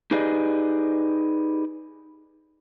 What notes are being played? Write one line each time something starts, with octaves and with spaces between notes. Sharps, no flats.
D#4 G4 G#4 B4 D5 D#5